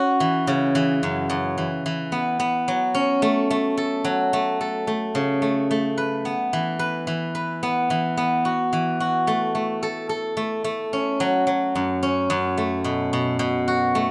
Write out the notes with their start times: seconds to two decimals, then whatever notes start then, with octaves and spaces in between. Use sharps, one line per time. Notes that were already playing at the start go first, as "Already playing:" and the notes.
Already playing: C#4 F#4
0.20 E3
0.47 C#3
0.75 E3
1.03 F#2
1.30 F#2
1.58 E3
1.86 E3
2.12 B3
2.40 B3
2.68 F#3
2.95 C#4
3.22 A3
3.51 A3
3.77 A4
4.04 F#3
4.33 A3
4.61 A4
4.87 A3
5.15 C#3
5.42 A3
5.71 A3
5.98 B4
6.25 B3
6.53 E3
6.79 B4
7.07 E3
7.35 B4
7.63 B3
7.90 E3
8.17 B3
8.45 F#4
8.73 E3
9.00 F#4
9.27 A3
9.55 A3
9.83 A4
10.09 A4
10.37 A3
10.64 A3
10.93 C#4
11.20 F#3
11.47 F#3
11.75 F#2
12.03 C#4
12.30 F#2
12.58 A3
12.84 B2
13.13 B2
13.39 B2
13.68 F#4
13.95 A3